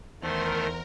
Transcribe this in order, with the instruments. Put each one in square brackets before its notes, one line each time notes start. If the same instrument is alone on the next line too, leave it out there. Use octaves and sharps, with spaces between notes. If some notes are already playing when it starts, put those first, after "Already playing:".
[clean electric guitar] E2 [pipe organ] D#3 A3 [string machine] A#4 [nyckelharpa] C5 C6